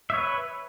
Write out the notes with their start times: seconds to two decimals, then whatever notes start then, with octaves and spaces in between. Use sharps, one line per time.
0.10 E5
0.13 C#5
0.17 B4